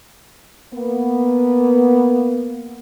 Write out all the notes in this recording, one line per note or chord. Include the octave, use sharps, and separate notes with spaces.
A#3 B3